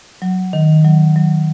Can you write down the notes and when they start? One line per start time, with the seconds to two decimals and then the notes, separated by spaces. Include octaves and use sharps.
0.22 F#3
0.53 D#3
0.84 F#3
1.16 F#3